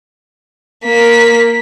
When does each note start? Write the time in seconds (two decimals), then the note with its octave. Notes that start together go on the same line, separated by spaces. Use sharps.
0.85 A#3 B6